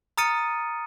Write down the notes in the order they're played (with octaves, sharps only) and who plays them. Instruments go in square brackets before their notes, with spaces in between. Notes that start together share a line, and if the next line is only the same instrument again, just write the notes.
[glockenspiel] A#5 D#6 F6 A6 C#7 D#7